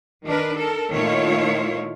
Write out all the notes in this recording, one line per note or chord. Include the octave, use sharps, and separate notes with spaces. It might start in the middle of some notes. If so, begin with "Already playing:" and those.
D#3 D4 A#4 B4
A4 A#4
A#2 D#3 A3 E4 F4 C#5